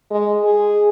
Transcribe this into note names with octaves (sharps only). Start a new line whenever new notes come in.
G#3
G#4